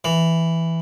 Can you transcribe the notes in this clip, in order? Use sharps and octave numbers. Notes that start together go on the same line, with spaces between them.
E3